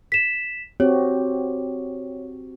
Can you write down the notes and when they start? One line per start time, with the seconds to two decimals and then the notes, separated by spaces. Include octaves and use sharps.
0.12 B6 E7
0.80 C4 F#4 G4 C#5